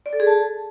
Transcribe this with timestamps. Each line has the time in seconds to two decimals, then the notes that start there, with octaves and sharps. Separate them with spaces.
0.06 D5
0.13 A4
0.20 G#4
0.27 A5